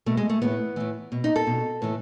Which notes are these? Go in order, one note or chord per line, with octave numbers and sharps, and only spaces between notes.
B2 A3
G#3
A3
A2 E3 B3
A2 E3
B2
D#4
A4
B2
A2 E3